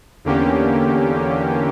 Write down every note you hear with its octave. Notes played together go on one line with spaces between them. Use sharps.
E2 D3 A#3 C#4 G4